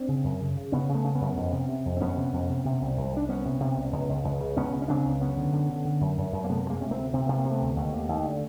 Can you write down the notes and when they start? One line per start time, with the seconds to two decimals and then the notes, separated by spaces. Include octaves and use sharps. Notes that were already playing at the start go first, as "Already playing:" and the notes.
Already playing: C4 D4
0.08 C#3
0.24 F#2
0.40 C#3
0.57 C#3
0.72 C#3 B3 C#4
0.89 C#3
0.95 A3 B3
1.04 C#3
1.15 B3 C#4
1.21 F#2
1.37 F2
1.52 C3
1.68 C3
1.85 F2
1.97 C4
2.00 F2 B3 C#4
2.17 C3
2.33 F2
2.49 C3
2.65 C3
2.81 C2
2.97 C2
3.13 C2 D4
3.28 C2 B3 C#4
3.45 C3
3.60 C3
3.76 C2
3.93 C#2
4.09 C#2
4.24 C#2
4.41 C#3
4.57 C#2 B3 C#4
4.72 C#3
4.82 C#4
4.88 C#3 C4 D4
5.05 C#2
5.20 F#2 B3 C#4
5.37 D3
5.53 D3
5.69 D3
5.85 D3
6.01 F#2
6.18 F#2
6.32 F#2
6.44 A#3
6.49 C3 A3 B3
6.65 D2
6.70 G#3 A#3
6.81 C3 C#4
6.91 A#3 C4
6.97 D2
7.14 C3 C4
7.26 C3 B3
7.37 A#3
7.45 C3
7.51 A3 B3
7.62 D2
7.77 D#2
7.93 D#2
8.09 D#2
8.25 D3